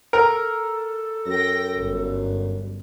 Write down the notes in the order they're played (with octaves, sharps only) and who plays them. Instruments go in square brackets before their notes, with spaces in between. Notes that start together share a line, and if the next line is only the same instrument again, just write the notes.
[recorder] A4 [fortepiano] A#4
[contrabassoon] F#2 [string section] G5 A#6
[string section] G1